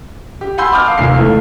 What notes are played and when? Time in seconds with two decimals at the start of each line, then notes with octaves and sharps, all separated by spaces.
0.41 G4
0.58 F#5 G#5 B5 C6 E6 G6
0.72 A5 B5 D6 D#6 F6 G6
0.85 F5 D6 D#6
0.98 F1 D#2 G#5 C7
1.14 C#2 E3 A3